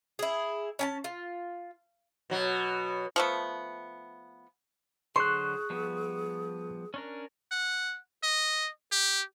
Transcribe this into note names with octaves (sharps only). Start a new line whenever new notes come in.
E4 G#4
C#4 G#5 A5
F4
B2 F#3
F3 A3 B3
D3 F#3 G#4 C5 C6 C#6 F#6
F3 G3 B3
C#4 D4 A#4
F#5
D#5
G4